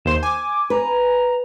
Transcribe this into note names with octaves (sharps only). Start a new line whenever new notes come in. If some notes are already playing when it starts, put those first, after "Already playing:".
D#2 C5 C6 E7
G#5 D6
B4 A#5